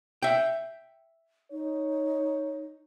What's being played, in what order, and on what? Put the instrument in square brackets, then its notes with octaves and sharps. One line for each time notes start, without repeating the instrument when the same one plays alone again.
[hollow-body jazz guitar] E5 G5
[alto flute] D#4 [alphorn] C#5